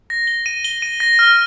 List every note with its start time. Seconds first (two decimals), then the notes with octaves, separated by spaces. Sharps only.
0.10 A#6
0.27 G7
0.46 D#7
0.65 G7
0.82 D#7
1.00 A#6
1.19 F6